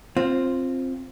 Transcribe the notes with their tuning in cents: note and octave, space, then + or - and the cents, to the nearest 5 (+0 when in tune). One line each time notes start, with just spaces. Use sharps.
C4 +10 F4 +0